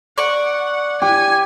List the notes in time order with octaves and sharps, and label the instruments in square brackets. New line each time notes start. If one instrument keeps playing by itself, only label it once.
[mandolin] D5 C#6 [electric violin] F#5
[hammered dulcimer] G4 [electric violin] G#5